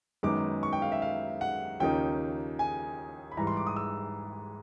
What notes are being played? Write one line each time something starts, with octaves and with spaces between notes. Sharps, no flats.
F#2 D#3 G#3 B3 D#4 D6
C#6
G5
F5
E5
F5
F#5
D#2 C#3 F3 A#3 D#4 G5
G#5
B5
G#2 E3 G3 A#5
C6
D6
D#6
E6